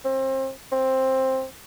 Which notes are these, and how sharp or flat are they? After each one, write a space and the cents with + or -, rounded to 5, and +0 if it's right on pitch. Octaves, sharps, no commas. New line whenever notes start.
C4 +30
C4 +10